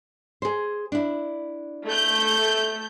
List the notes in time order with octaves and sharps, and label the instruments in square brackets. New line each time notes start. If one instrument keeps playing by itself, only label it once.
[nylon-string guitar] G#4 C5
D4 E4
[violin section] A3 G6